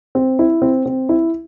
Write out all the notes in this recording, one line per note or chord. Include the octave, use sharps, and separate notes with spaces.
C4
E4
C4
C4
E4